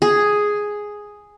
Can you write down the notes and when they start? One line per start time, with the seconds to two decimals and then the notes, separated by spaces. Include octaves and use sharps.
0.02 G#4